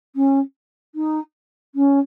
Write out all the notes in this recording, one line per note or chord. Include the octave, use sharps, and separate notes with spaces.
C#4
D#4
C#4